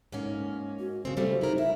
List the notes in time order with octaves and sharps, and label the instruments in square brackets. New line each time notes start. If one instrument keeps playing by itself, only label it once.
[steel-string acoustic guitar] G#2 A#3 C#4
[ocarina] F#4
[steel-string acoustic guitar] C#3 C4
[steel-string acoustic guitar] C#3 G3 A3 [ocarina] C5
[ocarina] D#4 [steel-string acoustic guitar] E4 A#4
[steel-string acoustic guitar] E4 [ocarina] E5